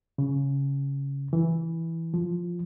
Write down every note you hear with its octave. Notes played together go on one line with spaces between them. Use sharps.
C#3
E3
F3